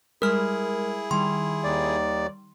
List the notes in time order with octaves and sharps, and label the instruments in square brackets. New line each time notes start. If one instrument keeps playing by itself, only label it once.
[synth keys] G3 G#3 [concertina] E4 G#4 [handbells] A#4 F6
[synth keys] D#3 G3 [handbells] C6
[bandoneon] D#2 D5